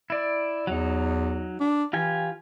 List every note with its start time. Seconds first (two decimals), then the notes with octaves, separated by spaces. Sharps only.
0.10 E4 D5
0.67 E2 F#3 D#4
1.60 D4
1.93 E3 F4 G4 G#5